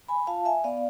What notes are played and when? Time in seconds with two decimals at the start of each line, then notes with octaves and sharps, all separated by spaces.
0.08 G#5 B5
0.27 F4 F5 A5
0.45 E5 G#5
0.64 B3 D5 F5